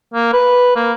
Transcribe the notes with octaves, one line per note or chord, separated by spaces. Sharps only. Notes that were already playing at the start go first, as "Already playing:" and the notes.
A#3
B4
A#3